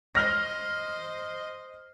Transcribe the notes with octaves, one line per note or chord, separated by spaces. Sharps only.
C5 D#5 F6 A#6